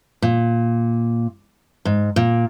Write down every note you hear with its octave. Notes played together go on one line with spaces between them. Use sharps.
A#2
G#2
A#2